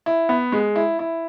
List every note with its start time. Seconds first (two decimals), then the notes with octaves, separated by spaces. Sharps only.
0.06 E4
0.29 B3
0.52 G#3
0.76 E4
0.99 E4